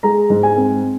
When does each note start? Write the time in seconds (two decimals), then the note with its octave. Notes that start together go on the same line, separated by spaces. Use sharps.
0.03 G#3 A#5
0.30 G#2
0.43 G#5
0.56 C4